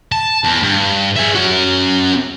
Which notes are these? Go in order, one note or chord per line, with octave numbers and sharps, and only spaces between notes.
A5
E2
G2
G#4 E5
C#4 F#4